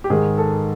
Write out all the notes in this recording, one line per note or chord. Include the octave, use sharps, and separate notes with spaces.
G4
G#2 D#3 G#4
A4